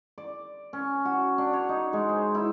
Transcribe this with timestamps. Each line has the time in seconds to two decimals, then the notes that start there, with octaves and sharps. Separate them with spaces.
0.18 D5
0.73 C#4
1.05 F#4
1.38 D4
1.53 C#5
1.69 D#4
1.93 G#3
2.09 C5
2.35 E4